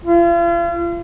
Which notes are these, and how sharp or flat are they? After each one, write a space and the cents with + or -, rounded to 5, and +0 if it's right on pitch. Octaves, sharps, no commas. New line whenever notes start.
F4 -40